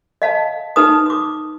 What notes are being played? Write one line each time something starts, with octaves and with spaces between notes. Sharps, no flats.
D#5 F5 A5
D#4 B4 A5 D#6
D6 D#6